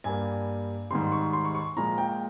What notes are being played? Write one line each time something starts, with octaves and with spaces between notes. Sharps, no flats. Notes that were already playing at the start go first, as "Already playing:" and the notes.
G2 G3 A#3 G#5
G#2 D#3 G3 C6
C#6
C6
C#6
C#6
A#2 F3 G#3 A#5
G5